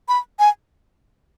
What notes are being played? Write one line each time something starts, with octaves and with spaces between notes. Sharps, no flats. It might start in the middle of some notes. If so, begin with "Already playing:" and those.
B5
G#5